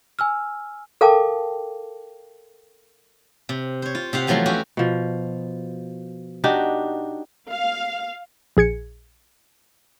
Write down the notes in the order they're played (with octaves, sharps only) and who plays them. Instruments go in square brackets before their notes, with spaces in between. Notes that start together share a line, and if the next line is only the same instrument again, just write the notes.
[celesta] G#5 E6 F6
[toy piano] A4 A#4 F5 G5 A5 D6
[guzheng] C3
C5 C#5
F4
C3 G4 F5 F#5
E2 F3 F#3 A3 C6
C4 C#4 F#4 G4
[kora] B2 F3
D4 D#4 F#4 G4
[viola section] F5
[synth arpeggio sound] A#1 G#4 G#6 C#7